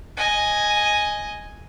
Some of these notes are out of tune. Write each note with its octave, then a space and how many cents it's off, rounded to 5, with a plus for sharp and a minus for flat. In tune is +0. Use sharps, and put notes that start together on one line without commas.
D#5 +0 G#5 +0